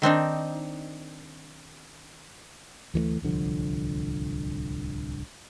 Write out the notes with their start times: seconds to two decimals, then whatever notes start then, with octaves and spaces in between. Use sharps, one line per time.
0.02 D#3 C4 D4 D#4
2.94 D2 E3 G3 A3
3.22 D1 C2 D3 F3